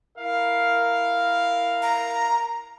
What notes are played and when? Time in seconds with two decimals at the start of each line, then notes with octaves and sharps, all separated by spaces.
0.18 E4 A#4 F5
1.82 A#5